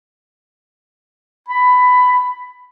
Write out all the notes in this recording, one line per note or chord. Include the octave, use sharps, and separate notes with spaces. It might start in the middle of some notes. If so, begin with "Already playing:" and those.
B5